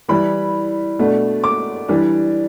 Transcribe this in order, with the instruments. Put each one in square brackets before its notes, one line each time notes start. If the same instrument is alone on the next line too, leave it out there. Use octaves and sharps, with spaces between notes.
[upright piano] E3 G3 E4 B5
B2 A3 D4
D6
E3 G3 D4